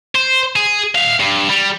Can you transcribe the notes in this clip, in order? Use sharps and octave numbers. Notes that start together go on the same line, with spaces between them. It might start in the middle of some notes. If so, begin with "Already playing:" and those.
C5
G#4
E5 F5
G2
G3